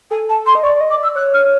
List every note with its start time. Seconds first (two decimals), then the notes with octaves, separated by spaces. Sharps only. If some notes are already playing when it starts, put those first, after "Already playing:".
0.10 A4 G#5
0.29 A5
0.46 C6
0.55 D#5
0.63 D5 C#6
0.76 D5
0.81 D#5
0.90 D6
0.98 D5 E6
1.15 C#5 F#6
1.33 F6